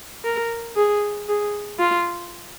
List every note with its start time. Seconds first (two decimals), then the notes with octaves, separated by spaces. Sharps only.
0.25 A#4
0.77 G#4
1.28 G#4
1.79 F4